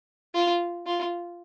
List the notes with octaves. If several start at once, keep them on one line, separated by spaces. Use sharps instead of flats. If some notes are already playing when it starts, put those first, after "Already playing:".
F4
F4